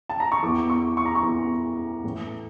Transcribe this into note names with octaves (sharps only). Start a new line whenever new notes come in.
A5
A#5
C#6
E2 E3 D6
C#6
C#6
A#5
C#6
E2 E3
A2 E3